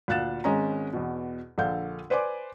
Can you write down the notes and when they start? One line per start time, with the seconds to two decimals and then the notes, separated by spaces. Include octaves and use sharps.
0.08 D2 A#2 F5 F#6 A6 E7
0.44 G#1 G#3 C#4 A#5
0.93 E2 B2
1.58 A#1 D3 A4 F5 G6
2.10 B4 C5 D5 G#5 D6